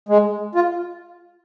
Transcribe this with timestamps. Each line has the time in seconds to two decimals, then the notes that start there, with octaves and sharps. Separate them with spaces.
0.09 G#3
0.55 F4